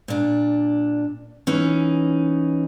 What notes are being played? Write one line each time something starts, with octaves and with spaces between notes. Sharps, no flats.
A#2 D4
E3 C#4 D#4